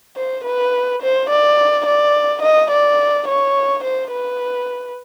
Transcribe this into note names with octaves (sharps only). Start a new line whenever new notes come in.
C5
B4
C5
D5
D5
D#5
D5
C#5
C5
B4